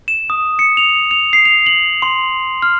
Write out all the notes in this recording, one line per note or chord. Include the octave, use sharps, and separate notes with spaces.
E7
D#6
C#7
F7
F7
C7
F7
F#7
C6
F6